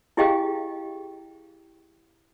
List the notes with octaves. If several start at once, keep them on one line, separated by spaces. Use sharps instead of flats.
E4 G4 G#4 D#5 F5 G5